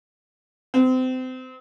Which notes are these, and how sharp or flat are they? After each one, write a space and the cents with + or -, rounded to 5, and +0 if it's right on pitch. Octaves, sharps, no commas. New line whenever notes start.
C4 -30